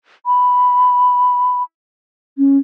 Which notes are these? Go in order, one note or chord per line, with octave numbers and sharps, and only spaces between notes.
B5
C#4